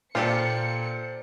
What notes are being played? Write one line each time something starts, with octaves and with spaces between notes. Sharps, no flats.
A#2 F4 G4 A4 C5 D5 C#7